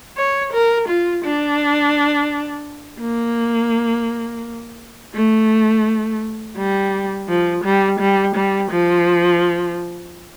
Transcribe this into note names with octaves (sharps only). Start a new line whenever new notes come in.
C#5
A#4
F4
D4
A#3
A3
G3
F3
G3
G3
G3
F3